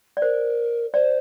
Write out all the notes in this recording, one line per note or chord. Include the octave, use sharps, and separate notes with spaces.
D5
A#4 C5
C5 D5